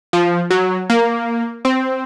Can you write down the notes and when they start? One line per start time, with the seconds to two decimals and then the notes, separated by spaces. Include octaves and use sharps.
0.13 F3
0.50 F#3
0.90 A#3
1.65 C4